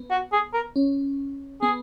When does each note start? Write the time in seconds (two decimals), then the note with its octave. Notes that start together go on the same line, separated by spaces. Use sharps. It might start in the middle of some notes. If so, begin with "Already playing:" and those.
Already playing: B3
0.11 F#4
0.32 G#4
0.54 A#4
0.76 C#4
1.62 B3 G#4